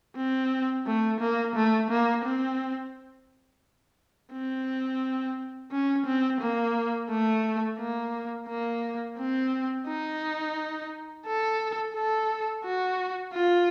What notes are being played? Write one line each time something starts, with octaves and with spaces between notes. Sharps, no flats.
C4
A3
A#3
A3
A#3
C4
C4
C#4
C4
A#3
A3
A#3
A#3
C4
D#4
A4
A4
F#4
F4